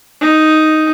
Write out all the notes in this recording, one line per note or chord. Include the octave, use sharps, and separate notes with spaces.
D#4